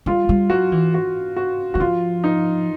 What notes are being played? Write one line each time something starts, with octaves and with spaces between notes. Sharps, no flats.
G3 F4
G3
F#3 F#4
E3
F#4
F#4
F#3 F#4
F3 F4
D#4